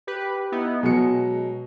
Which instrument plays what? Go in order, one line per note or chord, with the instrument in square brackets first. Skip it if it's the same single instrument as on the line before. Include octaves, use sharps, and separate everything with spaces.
[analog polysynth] G4 B4
B3 D#4 E4
[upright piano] B2 F#3 C#7 [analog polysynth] G#3